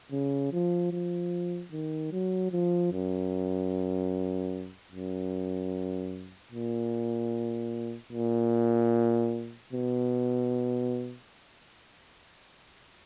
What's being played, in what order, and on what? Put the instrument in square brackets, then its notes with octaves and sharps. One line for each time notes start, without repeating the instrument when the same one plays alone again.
[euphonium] C#3
F3
F3
D#3
F#3
F3
F#2
F#2
A#2
A#2
B2